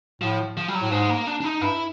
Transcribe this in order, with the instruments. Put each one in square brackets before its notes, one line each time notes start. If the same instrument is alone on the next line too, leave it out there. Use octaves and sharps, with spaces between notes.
[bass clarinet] A2 [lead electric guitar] F3
[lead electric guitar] F3
G3
F#3
[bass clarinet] A2
[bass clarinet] G#2 [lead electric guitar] G#3
[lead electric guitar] A#3
D4
D4
D#4
[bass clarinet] G2 [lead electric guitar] E4